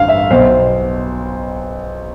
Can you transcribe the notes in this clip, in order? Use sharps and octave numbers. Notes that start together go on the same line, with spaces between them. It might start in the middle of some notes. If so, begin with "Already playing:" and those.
Already playing: A1 G2 D3 F5
E5
B1 B2 C5